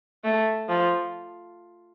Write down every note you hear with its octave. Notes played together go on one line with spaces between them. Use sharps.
A3
F3